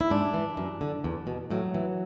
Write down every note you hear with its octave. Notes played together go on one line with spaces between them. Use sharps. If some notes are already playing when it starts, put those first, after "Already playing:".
E4
G#2 D4
E3
F#2
D3
E2
B2
A2 F#3
E3